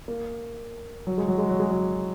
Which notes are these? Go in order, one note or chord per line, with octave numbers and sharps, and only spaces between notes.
A#3
F#3
G#3
F#3
G#3
F#3
G#3
F#3